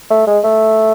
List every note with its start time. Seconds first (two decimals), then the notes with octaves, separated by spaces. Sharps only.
0.10 A3
0.27 G#3
0.44 A3